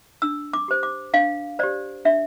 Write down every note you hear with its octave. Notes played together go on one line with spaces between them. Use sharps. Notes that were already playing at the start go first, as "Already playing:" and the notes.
D4 E6
D6
G4 C5
D6
D4 F5
G4 C5 D5
D4 E5